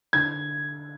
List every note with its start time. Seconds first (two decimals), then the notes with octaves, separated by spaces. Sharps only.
0.13 D3 G#6